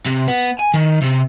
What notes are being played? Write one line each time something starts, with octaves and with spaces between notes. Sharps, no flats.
C3
B3
G#5
D#3
C3